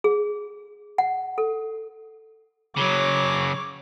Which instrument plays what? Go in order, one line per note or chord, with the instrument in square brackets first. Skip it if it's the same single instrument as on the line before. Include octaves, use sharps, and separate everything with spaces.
[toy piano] G#4
F#5
A4
[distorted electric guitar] C#3 F#3 [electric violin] C#5 D6